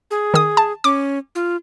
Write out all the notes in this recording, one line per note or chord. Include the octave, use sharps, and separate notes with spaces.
G#4
D#3 D#6
A5
C#4 D6
F4